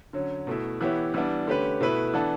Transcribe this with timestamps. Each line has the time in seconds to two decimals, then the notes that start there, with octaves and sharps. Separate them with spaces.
0.13 D3 F#3 C#4
0.47 B2 A3 E4
0.81 E3 B3 E4 G4 C#5
1.14 E3 G3 B3 D4
1.47 D3 A3 C#4 G4 B4
1.80 B2 A3 E4 B4
2.13 E3 B3 D4 A4